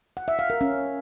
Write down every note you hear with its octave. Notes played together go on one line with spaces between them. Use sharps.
F#5
E5
F5
A#4
C#4